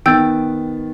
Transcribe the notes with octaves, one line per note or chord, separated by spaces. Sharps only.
D#3 B3 G5 E6 G6 A6